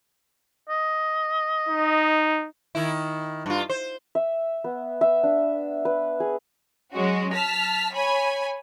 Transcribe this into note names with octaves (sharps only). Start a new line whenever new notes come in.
D#5
D#4
D#3 E4
G2 F4
C5
E5
B3
E5
D4
B4
G#4
F#3 G#3 C#4 F#4
A5 F6 B6
C#5 G#5 B5